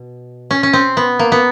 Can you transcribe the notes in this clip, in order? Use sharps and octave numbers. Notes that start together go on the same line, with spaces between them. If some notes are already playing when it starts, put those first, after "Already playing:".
Already playing: B2
C#4
C#4
C4
B3
A#3
B3